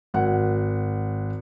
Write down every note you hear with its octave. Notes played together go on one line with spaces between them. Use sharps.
G#1 F#5